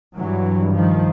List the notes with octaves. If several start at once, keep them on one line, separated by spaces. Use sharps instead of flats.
G2 E3 F#3
D#3 F3